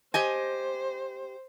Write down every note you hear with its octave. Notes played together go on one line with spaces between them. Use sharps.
G4 C5 D#5 G#5